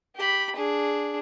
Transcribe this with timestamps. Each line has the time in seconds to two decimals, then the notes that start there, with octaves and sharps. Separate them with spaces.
0.16 G4 B5
0.55 D4 G#4